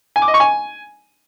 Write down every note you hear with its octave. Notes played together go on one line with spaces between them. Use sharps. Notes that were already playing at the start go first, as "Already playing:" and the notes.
G#5
D6
D#5
C#6
G#5